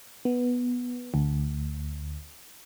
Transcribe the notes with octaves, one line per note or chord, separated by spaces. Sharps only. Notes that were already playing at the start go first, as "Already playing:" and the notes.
B3
D2